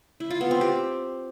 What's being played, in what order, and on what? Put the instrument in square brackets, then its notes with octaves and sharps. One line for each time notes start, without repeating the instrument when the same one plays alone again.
[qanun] E4
F4
B3
C4
G4